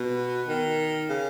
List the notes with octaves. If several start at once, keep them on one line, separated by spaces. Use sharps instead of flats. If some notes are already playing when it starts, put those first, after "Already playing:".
Already playing: B2
D#3
C#3